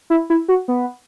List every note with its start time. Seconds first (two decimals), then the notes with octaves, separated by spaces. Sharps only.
0.10 E4
0.30 E4
0.48 F#4
0.68 B3